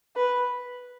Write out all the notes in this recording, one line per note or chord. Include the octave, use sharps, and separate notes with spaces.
B4